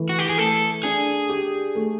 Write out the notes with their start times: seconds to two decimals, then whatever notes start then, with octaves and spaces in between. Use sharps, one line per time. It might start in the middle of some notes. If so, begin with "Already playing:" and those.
Already playing: E3 A3
0.09 F#4
0.19 G4
0.29 G#4
0.38 A3 A4
0.83 D4 G#4
1.29 G4
1.75 A3